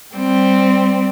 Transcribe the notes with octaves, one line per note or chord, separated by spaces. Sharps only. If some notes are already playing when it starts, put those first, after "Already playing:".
G3 C4